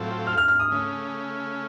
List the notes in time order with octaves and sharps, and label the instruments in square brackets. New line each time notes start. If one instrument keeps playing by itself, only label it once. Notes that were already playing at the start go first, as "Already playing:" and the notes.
Already playing: [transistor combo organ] A2 F#3 C4 F4 A4
[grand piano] F6
F6
F6
D#6
[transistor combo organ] C#3 A3 C#4